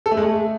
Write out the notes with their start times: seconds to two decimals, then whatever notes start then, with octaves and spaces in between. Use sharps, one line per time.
0.06 A4
0.11 A3
0.17 G#3
0.23 A3